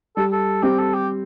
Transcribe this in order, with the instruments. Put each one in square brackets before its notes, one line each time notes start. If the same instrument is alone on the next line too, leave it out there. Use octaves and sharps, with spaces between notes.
[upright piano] G3 [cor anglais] A4
[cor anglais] A4
[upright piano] G3 C4 [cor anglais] G4
[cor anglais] A4
G4